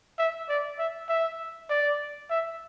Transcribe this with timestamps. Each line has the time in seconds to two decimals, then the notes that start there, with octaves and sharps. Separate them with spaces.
0.19 E5
0.49 D5
0.79 E5
1.09 E5
1.70 D5
2.31 E5